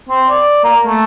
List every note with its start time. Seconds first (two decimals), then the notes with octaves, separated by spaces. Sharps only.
0.09 C4
0.29 D5
0.64 A#3
0.86 A3